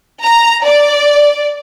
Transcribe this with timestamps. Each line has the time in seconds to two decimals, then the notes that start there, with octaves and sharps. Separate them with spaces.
0.23 A#5
0.65 D5